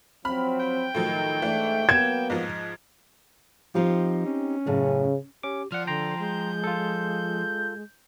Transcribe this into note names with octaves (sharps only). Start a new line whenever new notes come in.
F3 F#3 C4 B5 F6
G5
A2 D#3 F3 F#3
G#2 E3 A3 D4
F#3 A#3 B3 G#6 E7
G#2 F3 D#5
F3 C4 D#4 G4
C#4
F#2 A2 C#3
C#4 G4 D6
F3 D5 F#5 F6
D3 G5 A#5 C6
G#3 G6
F4 A4